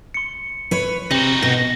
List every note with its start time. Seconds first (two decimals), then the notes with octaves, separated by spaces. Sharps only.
0.14 C6 C#7
0.71 B4 C#5
1.11 C3 D#4 F#4 F#7
1.43 B2 A#6